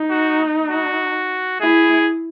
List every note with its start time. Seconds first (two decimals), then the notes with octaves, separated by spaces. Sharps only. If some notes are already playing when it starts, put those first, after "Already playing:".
Already playing: D#4
0.10 F#4
0.70 F#4
1.61 E4 G#4